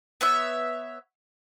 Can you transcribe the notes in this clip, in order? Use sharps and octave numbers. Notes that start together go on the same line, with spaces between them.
B3 C#5 E5